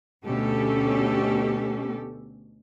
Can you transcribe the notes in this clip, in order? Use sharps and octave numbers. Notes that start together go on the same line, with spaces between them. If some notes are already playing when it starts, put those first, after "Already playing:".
D2 B2 C#4 G4 A4